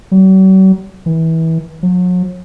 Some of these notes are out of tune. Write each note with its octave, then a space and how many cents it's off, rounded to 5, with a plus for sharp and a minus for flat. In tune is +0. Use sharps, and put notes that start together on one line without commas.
F#3 +45
E3 -25
F#3 -40